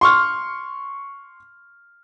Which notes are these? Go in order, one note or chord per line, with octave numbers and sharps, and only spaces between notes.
C6 C#6 F6